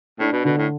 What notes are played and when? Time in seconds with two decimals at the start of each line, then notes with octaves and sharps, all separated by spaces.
0.19 A2 D4
0.32 B2
0.45 B2 D3
0.58 A2